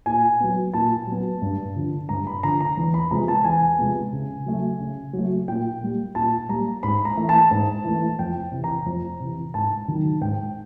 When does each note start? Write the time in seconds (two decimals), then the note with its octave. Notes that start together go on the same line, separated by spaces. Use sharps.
0.06 A#2 G#5
0.40 F#3 B3
0.74 A#2 A5
1.07 F#3 B3
1.42 G2
1.76 D3 F3
2.09 G2 A#5
2.27 B5
2.43 D3 F3 A#5
2.61 A#5
2.77 E2
2.94 B5
3.11 C3 F3 G#3 B3 A#5
3.28 A5
3.44 E2 G#5
3.78 C3 F3 G#3 B3
4.13 C#3
4.46 F#3 A3
4.80 C#3
5.13 F#3
5.18 A3
5.48 A#2 G5
5.81 G3 A#3
6.15 A#2 A5
6.49 G3 A#3 A#5
6.83 G#2 B5
7.05 A#5
7.17 E3 A3
7.29 A5
7.51 G#2
7.84 E3 A3
8.19 F2 G5
8.52 C3 E3
8.64 A#5
8.86 F2
9.20 C3 E3
9.54 G#2 A5
9.88 D#3 F#3
10.21 G#2 G5